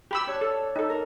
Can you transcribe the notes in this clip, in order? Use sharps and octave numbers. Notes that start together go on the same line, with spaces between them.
G4 B5 E6
D4 C#5 F#6
A4
D#4 A4
A#4